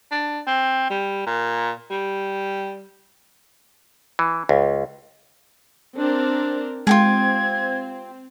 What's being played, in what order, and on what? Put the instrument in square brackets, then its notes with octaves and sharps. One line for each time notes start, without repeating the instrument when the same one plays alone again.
[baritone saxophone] D4
C4
G3
A#2
G3
[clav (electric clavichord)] E3
C#2
[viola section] C4 D4 A#4
[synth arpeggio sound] G#3 [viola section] C4 [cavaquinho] F4 G4 G#4 [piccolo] G#6